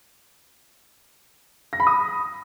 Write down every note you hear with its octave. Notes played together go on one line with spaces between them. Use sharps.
A#6
B5
D#6